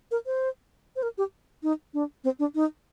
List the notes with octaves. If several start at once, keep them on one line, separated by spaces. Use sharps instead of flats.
A#4
C5
C5
A#4
G4
D#4
D4
C4
D4
D#4